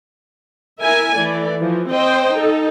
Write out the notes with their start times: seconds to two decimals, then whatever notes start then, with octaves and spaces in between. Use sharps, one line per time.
0.81 E4 A#4 E5 G#5
1.17 E3 A3 D5
1.58 E3 F3
1.90 C4 C5 D#5 G5
2.35 D#4 A4